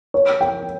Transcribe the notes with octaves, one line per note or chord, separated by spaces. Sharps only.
C#5
G5